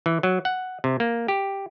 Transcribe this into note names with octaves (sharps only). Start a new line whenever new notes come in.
E3
F#3
F#5
C3
A#3
G4